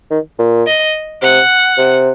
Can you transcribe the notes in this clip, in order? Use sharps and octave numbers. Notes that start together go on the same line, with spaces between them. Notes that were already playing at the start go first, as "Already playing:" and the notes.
D#3
A#2
D#5
C3 F#5
C3